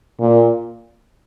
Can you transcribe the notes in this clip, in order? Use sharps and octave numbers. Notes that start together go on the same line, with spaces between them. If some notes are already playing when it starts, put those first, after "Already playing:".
A#2